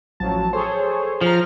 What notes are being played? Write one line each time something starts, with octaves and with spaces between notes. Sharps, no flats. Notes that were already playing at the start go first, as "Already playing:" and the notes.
A1 F3 F#3 A5
G#4 A4 C5 C#5
F3 A#5 F6